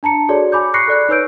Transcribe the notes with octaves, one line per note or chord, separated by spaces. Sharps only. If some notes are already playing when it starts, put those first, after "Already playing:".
D4 A5 A#5 C#7
F#4 G#4 A4 C#5 D5
G#5 B5 D6 G6
B5 C#6 F#6 A#6 C7 C#7
A4 D5 F#6
D#4 B4 C#5 E6 G6 D7